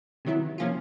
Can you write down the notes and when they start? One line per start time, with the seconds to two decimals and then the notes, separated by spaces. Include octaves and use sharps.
0.25 C3 D#3 F#3 B3 E4
0.58 C3 F3 A#3 C#4 F4